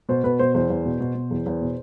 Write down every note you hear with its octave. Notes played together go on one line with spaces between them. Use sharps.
B2 C5
B2 B4
B2 C5
E2 C5
E2
B2
B2
B2
E2
E2
B2